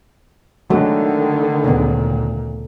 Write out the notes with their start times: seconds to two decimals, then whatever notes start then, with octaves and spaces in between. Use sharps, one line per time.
0.70 D3 D#3 F#3 G#3 A3 F#4
1.64 D2 A#2 C#3 B3